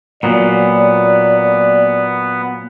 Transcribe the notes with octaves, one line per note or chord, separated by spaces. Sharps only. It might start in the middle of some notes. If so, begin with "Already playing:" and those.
A#2 F#3 B3 D5